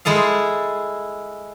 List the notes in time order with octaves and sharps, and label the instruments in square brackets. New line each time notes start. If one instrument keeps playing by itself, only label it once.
[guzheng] G#3 E4 A4 F5